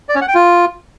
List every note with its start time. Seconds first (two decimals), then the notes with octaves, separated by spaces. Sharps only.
0.09 D5
0.15 C#4
0.22 F#5
0.28 G5
0.35 F4